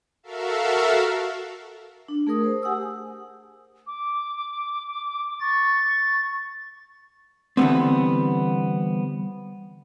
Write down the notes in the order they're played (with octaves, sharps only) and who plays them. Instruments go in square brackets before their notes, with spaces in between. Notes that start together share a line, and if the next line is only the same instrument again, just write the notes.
[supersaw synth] F#4 A4 A#4 E5 F5
[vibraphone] D4
A3 G#4 A#4 D#6
C5
G4 F#5 G#5 D#6 E6
[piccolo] D6
[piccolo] C#6 [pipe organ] A6
[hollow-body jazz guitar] D3 E3 G3 G#3 B3 C4